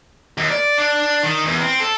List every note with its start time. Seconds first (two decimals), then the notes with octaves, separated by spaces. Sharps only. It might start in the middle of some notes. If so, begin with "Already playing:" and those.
0.38 D#2
0.50 D5
0.78 D4
1.23 D#3
1.46 E2
1.61 C4
1.80 A4